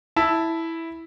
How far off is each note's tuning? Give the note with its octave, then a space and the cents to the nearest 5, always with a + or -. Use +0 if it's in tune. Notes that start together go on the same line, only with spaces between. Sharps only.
E4 -5 A5 +0